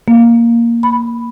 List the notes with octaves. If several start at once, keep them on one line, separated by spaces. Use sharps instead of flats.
A#3
B5